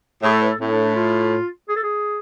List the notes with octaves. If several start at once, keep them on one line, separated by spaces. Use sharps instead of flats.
A2 G#4
A4
B4
A4
A2 C4
D4
D4
F4
G#4
A4
G#4